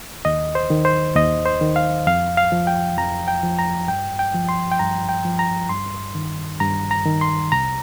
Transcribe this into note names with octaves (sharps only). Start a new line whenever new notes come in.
D#2 D#5
C5
D#3
C5
D#2 D#5
C5
D#3
F5
F2 F5
F5
F3
G5
F2 A#5
G5
F3
A#5
G2 G5
G5
F3
C6
G5
G2 A#5
G5
F3
A#5
G2 C6
D#3
G2 A#5
A#5
D#3
C6
C2 A#5